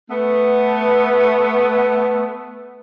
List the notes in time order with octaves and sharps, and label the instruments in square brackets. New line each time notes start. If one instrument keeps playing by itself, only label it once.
[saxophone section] A3 B3